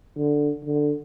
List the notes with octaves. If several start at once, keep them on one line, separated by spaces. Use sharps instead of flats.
D3
D3